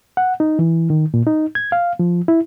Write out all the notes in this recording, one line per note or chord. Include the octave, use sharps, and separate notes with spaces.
F#5
D#4
E3
D#3
A#2
D#4
G#6
F5
F3
E4